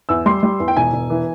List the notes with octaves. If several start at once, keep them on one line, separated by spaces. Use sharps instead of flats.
E2 E6
G3 C6
G3
E2
G5
E1 G#5
E1
E3